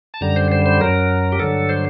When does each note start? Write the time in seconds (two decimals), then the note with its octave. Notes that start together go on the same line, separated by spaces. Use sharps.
0.14 A5
0.21 F#2 D3 G3 A#5
0.36 C5
0.52 C5
0.66 C5
0.81 F#2 F#3 A#4
1.32 G4
1.39 G2 D3 F#3 A4
1.69 C5